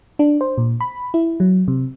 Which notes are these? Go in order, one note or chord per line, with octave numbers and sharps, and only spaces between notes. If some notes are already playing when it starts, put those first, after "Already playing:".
D4
C5
A#2
B5
E4
F#3
C3